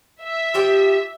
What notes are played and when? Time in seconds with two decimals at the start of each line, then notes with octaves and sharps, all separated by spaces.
0.22 E5
0.54 F3 G4 G5